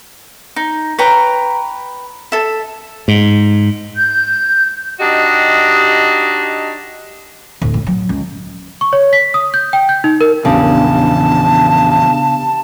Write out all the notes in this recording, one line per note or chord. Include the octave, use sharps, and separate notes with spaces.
D#4
B4 C#5 G5 A#5
A4 E5
G#2
G6
D4 D#4 F#4 G4 D#5
D1
A2
F#3
C#2
C#6
C#5
B6
D#6
G6
G5
G6
D#4
A#4
A#1 E2 C#3 E3 B3 D4 G4 A5